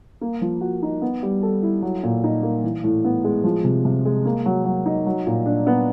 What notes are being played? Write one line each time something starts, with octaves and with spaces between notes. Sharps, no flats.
A#3
F3
F#4
D#4
B3
G3
A4
E4
F#3
A#2
D#4
A#3
E3
A2
B3
G#3
F3
C3
C3
G#3
A#3
F#3
F#3
D#4
F#3
A#2
D4
B3